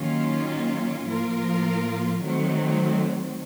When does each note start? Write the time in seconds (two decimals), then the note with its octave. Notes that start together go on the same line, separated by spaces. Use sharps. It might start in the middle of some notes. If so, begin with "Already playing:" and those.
Already playing: D#3 F#3 A#3 C#4 F4
1.05 A2 F3 A#3 F4 A#4
2.19 D#3 F#3 A3 C4